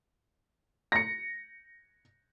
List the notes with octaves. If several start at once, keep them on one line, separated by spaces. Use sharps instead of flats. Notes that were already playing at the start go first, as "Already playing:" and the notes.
A#6 C#7